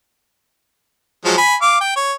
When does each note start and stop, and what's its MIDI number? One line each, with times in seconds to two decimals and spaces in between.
1.25 1.37 53
1.25 1.37 54
1.25 1.37 56
1.38 1.55 80
1.38 1.55 83
1.62 1.77 77
1.62 1.77 86
1.81 1.96 79
1.96 2.13 73